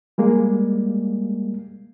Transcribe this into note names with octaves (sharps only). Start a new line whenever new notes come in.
G3 G#3 A#3